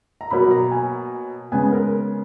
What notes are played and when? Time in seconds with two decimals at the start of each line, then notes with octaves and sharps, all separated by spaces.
0.21 A#5
0.31 B2 F#3 A#3 B5
0.51 A#5
0.71 G#5
1.52 C#3 G#3 B3 G#5
1.72 A#4